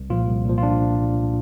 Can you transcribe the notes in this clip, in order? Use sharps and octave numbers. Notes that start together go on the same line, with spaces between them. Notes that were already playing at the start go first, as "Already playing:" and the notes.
Already playing: C2
A#2 F3 F4
C2
A#2 F3
F4
D4